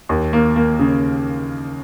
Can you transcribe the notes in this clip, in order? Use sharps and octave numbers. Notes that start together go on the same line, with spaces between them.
D#2
A#3
A#3
C#3